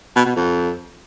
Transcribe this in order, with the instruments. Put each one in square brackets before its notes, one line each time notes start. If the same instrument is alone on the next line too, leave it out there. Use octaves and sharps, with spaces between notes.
[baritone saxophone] B2
B2
F2